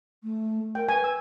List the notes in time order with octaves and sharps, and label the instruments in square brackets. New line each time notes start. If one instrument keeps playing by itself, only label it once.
[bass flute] A3
[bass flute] A#4 [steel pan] G5
[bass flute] B4 [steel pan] G#5
[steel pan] E6